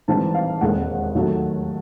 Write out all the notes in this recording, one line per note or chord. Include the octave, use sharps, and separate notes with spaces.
G#1 G#2 E3 G3 C4 A5
F5
E1 D#2 D#3 G#3 C4 F#5
D#2 D#3 F#3 A3